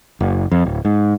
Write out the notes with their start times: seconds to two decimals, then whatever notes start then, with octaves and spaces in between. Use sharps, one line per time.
0.20 F#1
0.52 F2
0.66 D1
0.85 G#2